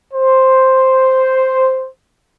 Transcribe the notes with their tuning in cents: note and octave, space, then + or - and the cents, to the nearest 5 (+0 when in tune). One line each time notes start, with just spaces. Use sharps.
C5 +0